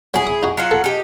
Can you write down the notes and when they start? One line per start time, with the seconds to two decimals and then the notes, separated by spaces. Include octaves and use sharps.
0.14 F#3 E4 G#4
0.27 D#6
0.43 D#4 F#4
0.57 F#3 F4 F#5
0.71 A4
0.84 D#4 G4